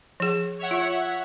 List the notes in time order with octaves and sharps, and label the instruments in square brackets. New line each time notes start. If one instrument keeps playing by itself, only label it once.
[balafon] F3 G#4
[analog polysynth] C#5 E5 F#5
[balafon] F4